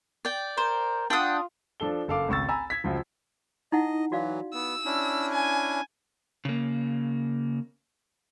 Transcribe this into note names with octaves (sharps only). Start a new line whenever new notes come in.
D5 G5
A#4 C5
D4 F4 F#5 G5 D#6
F3 D4 A4 G7
F#1 A4 F5 D6
G#1 C#2 C#6 E6 A6
G#5 A#5 B5 E6
G#6 B6
C#2 F3 F#3
D#4 E4 D#5 F#5
E3 F#3 F#4 D5 F5
B3 E6
C#4 D4 E4
G#5
C#3 A#3